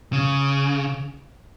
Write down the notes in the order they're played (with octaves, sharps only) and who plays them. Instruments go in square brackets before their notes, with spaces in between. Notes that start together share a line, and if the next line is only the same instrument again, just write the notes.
[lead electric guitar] C#3